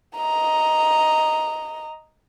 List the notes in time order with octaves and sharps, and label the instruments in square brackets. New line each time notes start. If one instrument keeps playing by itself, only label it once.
[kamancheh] D#5 A#5